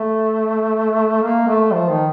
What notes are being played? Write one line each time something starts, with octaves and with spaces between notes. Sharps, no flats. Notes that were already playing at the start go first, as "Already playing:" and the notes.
Already playing: A3
A#3
A3
F3
D#3